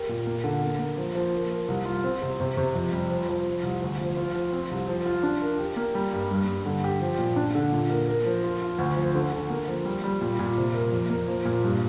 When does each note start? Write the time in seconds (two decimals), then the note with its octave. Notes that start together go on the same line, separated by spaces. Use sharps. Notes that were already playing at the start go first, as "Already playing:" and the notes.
Already playing: G4 A#4
0.09 A#2
0.27 A#3
0.44 D3
0.62 A#3
0.79 A#3
0.97 F3
1.15 F3
1.33 A#4
1.51 A#4
1.68 C2
1.86 F4
2.04 C4
2.22 C3
2.40 C3
2.57 C3
2.74 F2
2.93 G3
3.10 F3
3.29 F3
3.47 F3
3.63 C2
3.82 D2
4.00 F3
4.17 F4
4.36 F3
4.53 C4
4.71 C2
4.88 F3
5.06 F4
5.23 D4
5.42 A#4
5.59 G4
5.76 A#3
5.95 G3
6.13 G2
6.31 G2
6.48 G2
6.66 D3
6.84 G4
7.01 F3
7.19 A#2
7.36 D4
7.55 D3
7.72 A#2
7.90 A#4
8.08 A#4
8.26 F3
8.44 F4
8.62 F4
8.78 D2
8.96 F3
9.15 D3
9.33 D3
9.50 A#3
9.68 F3
9.85 G3
10.04 G3
10.21 A#2
10.39 A#2
10.57 C3
10.74 A#4
10.92 F2
11.10 A#3
11.28 F3
11.45 A#2
11.64 G2